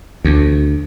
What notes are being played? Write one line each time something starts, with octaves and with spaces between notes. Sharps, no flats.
D2